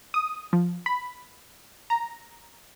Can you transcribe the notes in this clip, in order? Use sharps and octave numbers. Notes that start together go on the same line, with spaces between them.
D#6
F3
B5
A#5